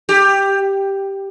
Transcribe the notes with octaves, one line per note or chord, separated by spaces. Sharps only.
G4